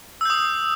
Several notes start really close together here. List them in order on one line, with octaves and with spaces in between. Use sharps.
E6 G6 D#6